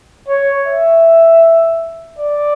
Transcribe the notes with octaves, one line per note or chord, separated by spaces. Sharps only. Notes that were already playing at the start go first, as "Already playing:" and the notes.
C#5
E5
D5